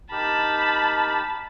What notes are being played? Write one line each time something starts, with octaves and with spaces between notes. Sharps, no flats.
D#4 G4 A#4 A5 B5